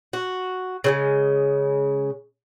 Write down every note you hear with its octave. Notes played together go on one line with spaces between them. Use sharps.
F#4
C#3 F#3 G#3